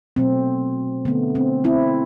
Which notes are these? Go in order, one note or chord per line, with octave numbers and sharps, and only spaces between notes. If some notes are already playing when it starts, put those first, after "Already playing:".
B2 F#3 A3 C4
D3 A3 B3
C4
C4 E4